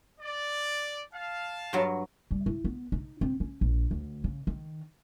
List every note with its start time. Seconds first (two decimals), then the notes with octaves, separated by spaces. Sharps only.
0.20 D5
1.12 F5 A5
1.73 G2 F#3
2.31 G3
2.46 E4
2.65 B3
2.92 D#4
3.21 C4
3.40 C#4
3.61 A#1
3.91 D2
4.24 C#3
4.47 D#3